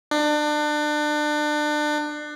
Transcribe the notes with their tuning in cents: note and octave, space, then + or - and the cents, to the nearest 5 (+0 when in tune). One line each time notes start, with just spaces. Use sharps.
D4 +30